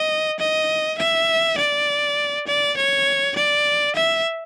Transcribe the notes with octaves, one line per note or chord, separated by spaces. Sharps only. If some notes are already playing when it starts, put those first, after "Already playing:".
Already playing: D#5
D#5
E5
D5
D5
C#5
D5
E5